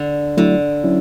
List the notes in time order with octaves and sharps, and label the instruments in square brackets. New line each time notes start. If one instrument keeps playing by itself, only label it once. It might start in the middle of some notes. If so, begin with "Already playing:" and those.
Already playing: [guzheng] D3
[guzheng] D3 [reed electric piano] F#3 A3 E4
[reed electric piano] F#3 C#4 E4